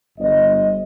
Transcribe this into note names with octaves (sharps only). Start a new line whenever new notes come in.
G1 D#5